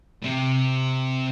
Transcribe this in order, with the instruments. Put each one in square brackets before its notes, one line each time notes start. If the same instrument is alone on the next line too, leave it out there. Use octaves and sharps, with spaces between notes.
[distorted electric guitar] C3 C4